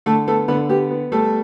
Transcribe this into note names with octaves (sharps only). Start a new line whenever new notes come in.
D3 A3 A4
A3 B3 A4
D3 B3 B4
B3 G4
B3
G3 A3 A4